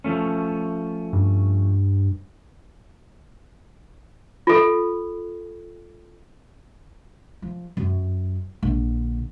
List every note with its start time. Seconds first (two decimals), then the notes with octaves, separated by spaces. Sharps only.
0.04 F3 A3 C#4
1.13 G2
4.47 F4 A4
7.42 F3
7.77 F#2
8.63 A#1 D3